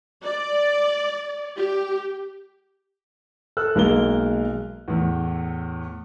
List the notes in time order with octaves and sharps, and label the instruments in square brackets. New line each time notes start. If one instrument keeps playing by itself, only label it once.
[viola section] D5
G4
[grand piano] A4 E6 F#6
B1 G#3 A#3 A#4 G7
E2 A2